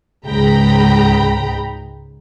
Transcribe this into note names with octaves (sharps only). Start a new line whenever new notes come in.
C#2 G#2 G#3 G5 A#5 B5